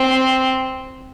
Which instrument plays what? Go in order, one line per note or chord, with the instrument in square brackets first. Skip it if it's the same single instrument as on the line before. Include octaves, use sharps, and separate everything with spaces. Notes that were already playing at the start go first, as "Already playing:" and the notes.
Already playing: [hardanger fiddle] C4